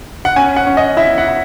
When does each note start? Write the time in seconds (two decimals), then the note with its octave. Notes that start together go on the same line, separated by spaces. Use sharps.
0.25 F#5
0.36 C#4 G#5
0.56 F#5
0.67 C#4
0.77 D#5
0.97 E4 E5
1.18 F#5
1.28 E4